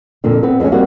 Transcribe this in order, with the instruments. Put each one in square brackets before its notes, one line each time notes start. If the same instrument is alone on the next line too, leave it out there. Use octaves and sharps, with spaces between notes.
[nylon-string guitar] F2 A#2 D3
B3 C4 B4
F2 G#3 C4 C#4
G3 A#3 C4 F#4